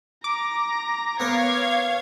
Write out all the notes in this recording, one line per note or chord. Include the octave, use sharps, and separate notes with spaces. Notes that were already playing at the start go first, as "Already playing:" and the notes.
A#5 D6
B3 A#4 C#5 F5 G#6